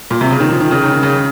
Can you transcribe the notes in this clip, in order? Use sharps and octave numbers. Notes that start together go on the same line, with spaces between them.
A#2
C3
C#3
D#3
F3
D#3
C#3
D#3
D#3
C#3